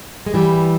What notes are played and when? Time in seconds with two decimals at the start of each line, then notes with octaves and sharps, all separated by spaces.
0.26 G#3
0.34 E3 G3